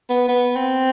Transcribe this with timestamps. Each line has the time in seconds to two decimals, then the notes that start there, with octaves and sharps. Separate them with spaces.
0.10 B3
0.29 B3
0.56 C4